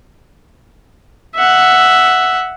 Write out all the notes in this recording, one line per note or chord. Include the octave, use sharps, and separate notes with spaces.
E5 F#5